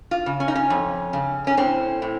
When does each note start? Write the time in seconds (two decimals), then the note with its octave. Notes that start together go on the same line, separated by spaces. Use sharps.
0.11 F4
0.26 C#3
0.40 C#4
0.48 D#4
0.55 C#4
0.70 F2
1.13 C#3
1.47 C#4
1.57 A2 C4
2.02 A2